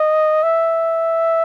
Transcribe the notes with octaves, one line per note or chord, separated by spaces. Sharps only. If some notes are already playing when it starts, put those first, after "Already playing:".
Already playing: D#5
E5